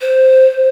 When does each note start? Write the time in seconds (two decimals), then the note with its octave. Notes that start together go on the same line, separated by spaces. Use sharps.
0.01 C5